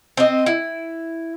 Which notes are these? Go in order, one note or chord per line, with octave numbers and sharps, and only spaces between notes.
C4 D#5
E4